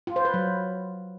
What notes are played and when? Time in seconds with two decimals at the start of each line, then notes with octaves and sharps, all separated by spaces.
0.07 F4
0.16 C5
0.25 B4
0.34 F#3